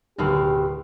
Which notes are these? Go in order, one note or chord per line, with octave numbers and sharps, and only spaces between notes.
D1 F#2 B2 D#3 G4